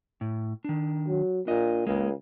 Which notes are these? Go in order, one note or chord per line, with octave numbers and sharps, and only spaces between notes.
A2
D#3 D4
F#3
A#2 D4 D#5
C#2 G#3 A#3